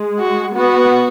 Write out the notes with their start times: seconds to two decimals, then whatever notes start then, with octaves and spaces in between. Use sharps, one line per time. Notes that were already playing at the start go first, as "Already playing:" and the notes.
Already playing: G#3
0.19 F#4
0.56 B3 F#4